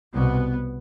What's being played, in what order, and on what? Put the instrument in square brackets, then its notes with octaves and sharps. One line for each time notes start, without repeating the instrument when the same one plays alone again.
[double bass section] C2 B2 B3